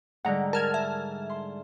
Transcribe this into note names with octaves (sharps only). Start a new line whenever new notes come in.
G#2 D3 G3 F#5 A#5
A#4 A5 F6 G#6
E5
C6